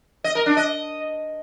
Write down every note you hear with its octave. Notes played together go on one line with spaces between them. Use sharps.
D#5
A#4
D4
D#5